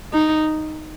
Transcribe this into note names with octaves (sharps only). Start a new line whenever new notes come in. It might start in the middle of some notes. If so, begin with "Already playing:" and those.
D#4